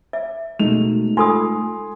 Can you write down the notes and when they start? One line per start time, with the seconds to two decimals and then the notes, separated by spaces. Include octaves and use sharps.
0.13 E5
0.59 B2 G#3 A3 D#4 F7
1.17 F4 A4 G#5 C6 D#6